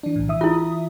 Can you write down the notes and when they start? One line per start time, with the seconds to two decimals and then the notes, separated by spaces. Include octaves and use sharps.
0.03 E3 D4
0.16 B1 A2
0.28 E3 E5 D#6
0.41 E4 F4